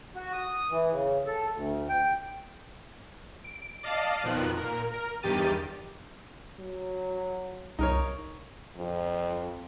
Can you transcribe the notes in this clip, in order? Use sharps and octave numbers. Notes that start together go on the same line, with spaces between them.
F#4
D#6
E3
C#3
A4
D2
G5
D7
D5 D#5 F5 A5 A6 C7
F2 B2 D#3 F3 F#6
A#2 A#4
A#4
E2 G2 D#3 G4 A6 D#7
F#3
C2 D#4 A#4 C#5
F2